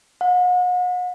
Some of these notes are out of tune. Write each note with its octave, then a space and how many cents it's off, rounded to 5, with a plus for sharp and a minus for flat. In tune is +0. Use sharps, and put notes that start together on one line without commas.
F#5 -40